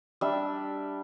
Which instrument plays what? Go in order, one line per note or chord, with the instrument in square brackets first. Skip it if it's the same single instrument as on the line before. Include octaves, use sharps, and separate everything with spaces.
[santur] G3 D4 E5